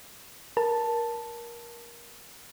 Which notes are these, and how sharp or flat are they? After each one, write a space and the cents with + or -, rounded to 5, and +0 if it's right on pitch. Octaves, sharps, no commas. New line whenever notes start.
A#4 +20 A5 +0